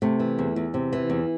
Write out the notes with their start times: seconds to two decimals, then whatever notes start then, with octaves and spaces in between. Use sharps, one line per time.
0.02 C3 A3
0.20 E3
0.39 E2
0.56 E2
0.74 C3
0.93 E3
1.10 E2